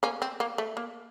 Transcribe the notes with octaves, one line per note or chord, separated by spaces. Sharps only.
A#3 C#4
C4
A#3
A3
A#3